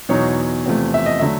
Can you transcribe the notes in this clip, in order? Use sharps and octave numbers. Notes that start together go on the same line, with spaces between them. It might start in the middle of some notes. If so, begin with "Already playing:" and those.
E2 B2 F#3 B3 D#4 C#5
E2 C3 F3 A3
E5
D#5
D3 F#3 A3 E5